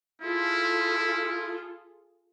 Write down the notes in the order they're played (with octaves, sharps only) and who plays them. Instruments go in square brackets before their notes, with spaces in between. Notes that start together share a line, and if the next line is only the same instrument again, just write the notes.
[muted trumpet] E4 [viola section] F4 G#4 A4